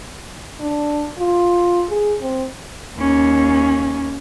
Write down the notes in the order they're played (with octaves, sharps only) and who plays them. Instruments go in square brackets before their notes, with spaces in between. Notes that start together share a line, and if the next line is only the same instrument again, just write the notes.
[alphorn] D4
F4
G#4
C4
[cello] D#2 C#4